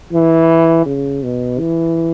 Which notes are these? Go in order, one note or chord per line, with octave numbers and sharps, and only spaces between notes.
E3
C#3
B2
E3